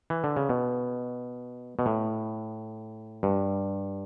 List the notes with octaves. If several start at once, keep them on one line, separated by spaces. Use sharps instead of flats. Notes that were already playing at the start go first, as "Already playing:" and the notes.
E3
D3
C#3
B2
B2
A2
G2